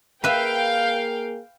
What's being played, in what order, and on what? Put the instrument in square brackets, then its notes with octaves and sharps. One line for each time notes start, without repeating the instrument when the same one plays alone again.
[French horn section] A#3 G#4 A#4 [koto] B4 E5 [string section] F5 G5